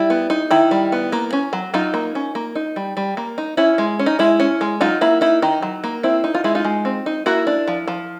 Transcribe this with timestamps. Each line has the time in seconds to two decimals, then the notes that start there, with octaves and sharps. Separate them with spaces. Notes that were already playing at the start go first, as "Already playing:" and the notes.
Already playing: G3 E4
0.10 B3
0.30 D#4
0.51 D#3 E4
0.71 G3
0.92 B3
1.12 A#3
1.33 C#4
1.53 F#3
1.74 F#3 D#4 F4
1.94 A#3
2.15 C#4
2.35 A#3
2.55 D#4
2.76 G3
2.97 G3
3.17 A#3
3.38 D#4
3.57 C#4 E4
3.78 G#3
3.99 C#4
4.06 D#4
4.19 G#3 E4
4.40 C#4
4.61 G#3
4.81 F#3 D#4 F4
5.01 A#3 E4
5.21 D#4 E4
5.42 D#3 D#4
5.62 F#3
5.84 A#3
6.03 C4 E4
6.24 D#4
6.34 F4
6.44 G#3 E4
6.55 D#4 F4
6.65 G#3
6.85 C4
7.06 D#4
7.26 A#3 E4 F#4
7.47 D4
7.67 F3
7.87 F3